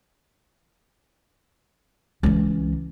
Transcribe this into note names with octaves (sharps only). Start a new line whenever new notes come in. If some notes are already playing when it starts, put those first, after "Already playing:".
C#2 E3